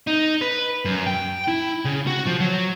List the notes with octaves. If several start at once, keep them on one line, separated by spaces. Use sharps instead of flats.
D#4
B4
F#2
G5
E4
C#3
F#4
F3
F#3